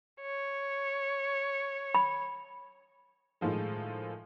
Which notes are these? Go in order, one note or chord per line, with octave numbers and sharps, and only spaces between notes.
C#5
B5
A2 D#3 F3 G#3